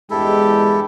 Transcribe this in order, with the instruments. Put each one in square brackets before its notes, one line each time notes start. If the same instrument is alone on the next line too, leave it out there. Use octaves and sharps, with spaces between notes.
[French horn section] E2 G2 G#3 [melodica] E4 A4 [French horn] G4